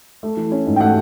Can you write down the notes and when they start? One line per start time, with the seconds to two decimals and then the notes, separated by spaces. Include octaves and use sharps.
0.23 A3
0.37 E3
0.52 C#4
0.66 G#2
0.76 G5
0.81 A3 F#5